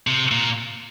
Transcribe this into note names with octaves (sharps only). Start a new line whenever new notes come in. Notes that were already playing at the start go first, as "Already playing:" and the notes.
C3
A#2